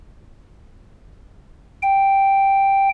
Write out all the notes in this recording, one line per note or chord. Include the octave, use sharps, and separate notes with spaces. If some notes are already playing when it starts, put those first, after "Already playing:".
G5